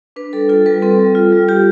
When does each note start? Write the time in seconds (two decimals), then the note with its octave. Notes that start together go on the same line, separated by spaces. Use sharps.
0.16 D4 B4
0.33 G3 A4
0.49 F4 A4
0.66 G3 B4
0.82 C4 A4
0.99 G3
1.15 F4
1.32 G3
1.48 F4 G4